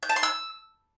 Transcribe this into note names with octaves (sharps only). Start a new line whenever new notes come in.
G6
A5
C6
E6